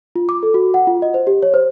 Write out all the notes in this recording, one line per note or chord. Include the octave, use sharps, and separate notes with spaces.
F4
D6
A4
F#4
F#5
F4
D#5
C5
G4
C#5
C5